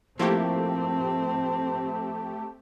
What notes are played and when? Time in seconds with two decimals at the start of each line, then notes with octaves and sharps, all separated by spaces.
0.19 F3 A3 A#3 C4 E4 G4 A5